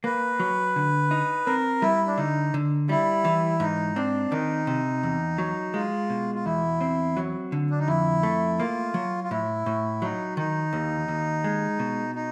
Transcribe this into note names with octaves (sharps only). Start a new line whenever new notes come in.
A#3 B4
F#3
D3
D#4
C4 A#4
G3 E4
D4
D3 D#4
D3
G3 E4
E3
G#2 D#4
C4 D4
D#3 D#4
C3
E2
F#3
G#3 F4
B2
F4
E2 E4
C4
F#3
D3
D4
D#4
F2 E4
A3
A#3 F4
F#3
F4
A2 E4
A2
F#3 D#4
D#3 D#4
D#2
D#2
G#3
B2
D#4